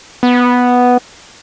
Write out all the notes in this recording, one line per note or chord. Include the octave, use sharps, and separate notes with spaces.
B3